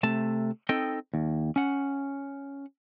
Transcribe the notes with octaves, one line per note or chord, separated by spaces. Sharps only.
C3 A3 A5
C4 D#4 A4 D#5 G5
D#2
C#4 F#5